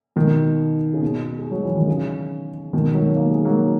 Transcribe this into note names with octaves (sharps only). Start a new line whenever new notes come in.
B2 D#3
C#3
B2
G#3
F#3
E3
D#3
C#3
B2 D#3
D#3 F#3
A#3
G#3
F#3 A#3